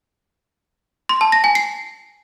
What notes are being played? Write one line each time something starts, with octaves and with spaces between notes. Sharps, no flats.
C6
A5
A#6
G#5
C7